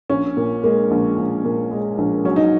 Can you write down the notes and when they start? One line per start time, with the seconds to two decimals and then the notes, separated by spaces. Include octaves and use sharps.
0.10 A#1 C#4
0.37 A#2
0.63 G#3 A#3
0.91 A#1
1.17 A#1
1.44 A#2
1.71 G#3
1.98 A#1
2.25 F#3 C#4
2.36 D#4